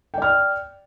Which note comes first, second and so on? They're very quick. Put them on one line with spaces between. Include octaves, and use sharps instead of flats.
G5 D5 F6